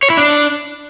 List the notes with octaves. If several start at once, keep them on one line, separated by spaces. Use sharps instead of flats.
C#5
E4
D4